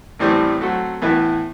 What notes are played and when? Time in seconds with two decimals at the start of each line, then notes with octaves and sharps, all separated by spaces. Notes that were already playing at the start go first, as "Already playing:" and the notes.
0.19 A1 A2 E3 G3 C4
0.61 F#3 A3 C4 F#4
1.02 A2 E3 B3 E4 B4